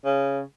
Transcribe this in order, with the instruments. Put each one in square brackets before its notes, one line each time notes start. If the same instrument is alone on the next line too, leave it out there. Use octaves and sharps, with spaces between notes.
[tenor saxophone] C#3